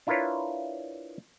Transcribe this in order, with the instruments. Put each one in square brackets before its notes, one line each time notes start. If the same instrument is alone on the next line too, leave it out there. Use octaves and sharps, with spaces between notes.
[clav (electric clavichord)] D4 E4 F4 A#4 B4 C#5